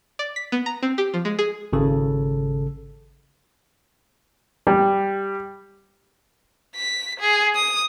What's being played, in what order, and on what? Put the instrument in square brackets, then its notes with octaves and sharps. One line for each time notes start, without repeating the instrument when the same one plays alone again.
[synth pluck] D5
B6
B3
A#5
C4
G4
F3
G#3
G#4
[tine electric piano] G#1 C#3 A4
[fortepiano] G3
[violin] B6
G#4
D#6